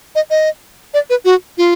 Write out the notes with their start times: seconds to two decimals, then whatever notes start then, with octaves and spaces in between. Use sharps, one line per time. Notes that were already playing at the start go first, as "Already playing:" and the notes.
0.15 D#5
0.30 D#5
0.94 D5
1.10 B4
1.25 F#4
1.58 F4